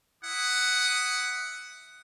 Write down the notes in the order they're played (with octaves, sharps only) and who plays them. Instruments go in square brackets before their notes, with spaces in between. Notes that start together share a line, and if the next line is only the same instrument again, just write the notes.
[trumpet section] E4 F#5 D#6